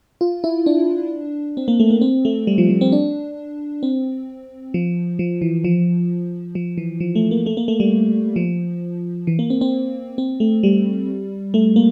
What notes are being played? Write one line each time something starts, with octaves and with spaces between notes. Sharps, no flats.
F4
E4
D4
C4
A#3
A3
A#3
C4
A3
G3
F3
F3
C4
D4
C4
F3
F3
E3
F3
F3
E3
F3
A3
A#3
A3
A#3
A3
G3
F3
E3
A#3
C4
C4
C4
A3
G3
A3
A#3